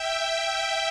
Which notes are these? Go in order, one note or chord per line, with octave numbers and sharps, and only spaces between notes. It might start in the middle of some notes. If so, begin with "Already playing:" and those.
Already playing: E5 G5
E5 G5